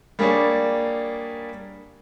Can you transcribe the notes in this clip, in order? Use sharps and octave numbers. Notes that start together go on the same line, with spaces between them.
G3 A#3 D4 G#4 C#5 D5